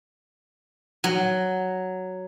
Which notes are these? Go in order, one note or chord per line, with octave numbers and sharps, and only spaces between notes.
F#3